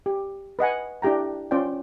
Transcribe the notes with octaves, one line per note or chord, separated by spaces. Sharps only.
G4
B4 D#5 F#5 G#5
D4 E4 G4 G5 A#5
C#4 F4 C5 D5 G5